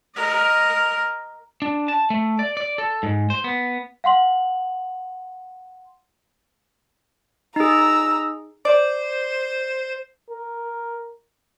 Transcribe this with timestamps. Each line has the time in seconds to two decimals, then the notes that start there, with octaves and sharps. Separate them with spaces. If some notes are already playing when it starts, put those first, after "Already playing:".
0.15 A#4 D#5
1.62 D4
1.88 A5
2.10 A3
2.39 D5
2.57 D5
2.78 A4
3.03 G#2
3.30 C5
3.44 B3
4.04 F5 F#5 C6 F#7
7.56 D#4 G#4 A#5 E6
8.65 C5 D5
10.30 A#4